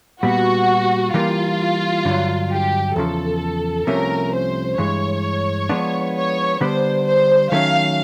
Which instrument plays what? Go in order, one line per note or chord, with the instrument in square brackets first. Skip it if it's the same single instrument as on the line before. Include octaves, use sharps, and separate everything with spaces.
[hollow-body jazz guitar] A#2 G3 B3 [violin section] F#4
[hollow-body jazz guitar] E3 G3 A#3 [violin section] F4
[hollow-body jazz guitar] G2 D3 F#3
[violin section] G4
[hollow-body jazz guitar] E2 C#3 F3 [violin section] A4
[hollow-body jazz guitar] C2 C3 F3 A3 C#4 [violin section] A#4
[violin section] C5
[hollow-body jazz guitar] G2 E3 G#3 [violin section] C#5
[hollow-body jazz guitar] F3 G#3 B3 D4
[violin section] C#5
[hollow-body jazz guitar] D3 G3 B3 D4 [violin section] C5
[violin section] C5
[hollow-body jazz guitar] D#3 F#3 A3 C#4 [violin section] F5